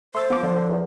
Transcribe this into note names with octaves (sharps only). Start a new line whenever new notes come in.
A3 C5 C6 E6 A6
F3 B3 F4 D6
D3 F3
D3
E2